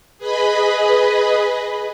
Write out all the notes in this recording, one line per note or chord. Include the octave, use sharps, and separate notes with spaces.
G#4 B4 D#5 B5